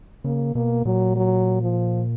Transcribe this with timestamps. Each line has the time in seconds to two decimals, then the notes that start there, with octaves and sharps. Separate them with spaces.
0.24 C#3 A#3
0.55 B2 A#3
0.85 A#2 F#3
1.16 F#3
1.62 F3